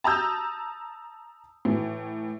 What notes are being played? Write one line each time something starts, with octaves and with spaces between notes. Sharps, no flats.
A5 A#5 D#6 E6 G6
A2 E3